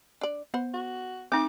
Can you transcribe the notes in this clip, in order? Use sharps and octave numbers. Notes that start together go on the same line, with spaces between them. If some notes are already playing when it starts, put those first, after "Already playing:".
D4 D5
B3 C5 F#5
F#4
A3 C4 D#4 D6